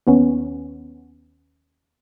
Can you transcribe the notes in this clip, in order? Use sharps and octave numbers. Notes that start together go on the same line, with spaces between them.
D#2 B3 C#4